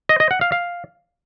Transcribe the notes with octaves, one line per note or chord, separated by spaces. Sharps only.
D#5
D#5
F#5
F5
F5